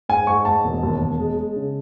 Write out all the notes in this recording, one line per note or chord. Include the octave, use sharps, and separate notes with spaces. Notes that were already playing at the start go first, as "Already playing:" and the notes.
G#2 G#5
G#2 C#6
G#2 A5
E1
D#2
E1
G#3
G#3
C#3